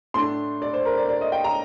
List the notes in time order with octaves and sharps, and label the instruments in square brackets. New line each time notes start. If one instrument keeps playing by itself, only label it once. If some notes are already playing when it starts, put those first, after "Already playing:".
[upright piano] A2 A3 D4 C6
D5
C5
A#4
D5
D5
D#5
G5
A#5